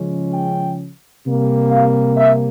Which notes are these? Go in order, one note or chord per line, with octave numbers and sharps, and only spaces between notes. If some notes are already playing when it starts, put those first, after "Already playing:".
Already playing: C#3 F3 G#3 C#4
G5
C3 G3 A#3
F5
E5